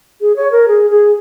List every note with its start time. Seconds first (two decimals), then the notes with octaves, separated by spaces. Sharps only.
0.21 G#4
0.36 C#5
0.51 A#4
0.68 G#4
0.90 G#4